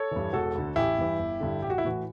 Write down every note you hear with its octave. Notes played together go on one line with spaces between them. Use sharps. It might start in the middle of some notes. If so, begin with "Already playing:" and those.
Already playing: A4 C#5
G2 E3
E1 F#4 A4
D2 D3
A1 E4 G4
G2 E3
G1
G2 D3
A1 G4
F#4
E4
A2 E3 F#4